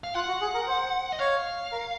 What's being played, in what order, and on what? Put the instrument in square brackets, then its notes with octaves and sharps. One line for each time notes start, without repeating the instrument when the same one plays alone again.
[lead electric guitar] F5
[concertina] F4 [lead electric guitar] F#5
[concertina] F#4
G#4
A#4
C5
[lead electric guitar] D#5
[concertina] C#5 [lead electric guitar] F5
[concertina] A#4